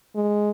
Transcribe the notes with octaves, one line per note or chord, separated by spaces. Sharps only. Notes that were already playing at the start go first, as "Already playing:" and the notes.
G#3